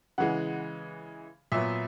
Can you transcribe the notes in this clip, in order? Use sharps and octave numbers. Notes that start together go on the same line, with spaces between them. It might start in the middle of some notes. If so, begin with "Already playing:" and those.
C#3 E3 G#3 F#5
A#2 F#3 B3 E5